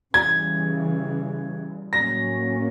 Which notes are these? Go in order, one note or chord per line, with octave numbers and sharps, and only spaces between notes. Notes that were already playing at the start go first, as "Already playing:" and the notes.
C#3 E3 G3 G#6
A2 F#3 A#3 C#4 A#6